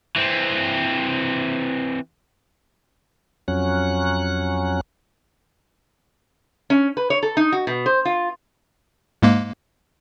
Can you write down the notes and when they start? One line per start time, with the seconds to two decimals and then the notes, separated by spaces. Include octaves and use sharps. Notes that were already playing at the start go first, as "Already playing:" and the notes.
0.16 E3 C4
3.48 F2 F#3 C#4 F#6
6.70 C#4
6.97 B4
7.10 C#5
7.23 A4
7.37 D#4
7.52 F#4
7.67 B2
7.86 C5
8.05 F4
9.22 G#2 G#3 A#3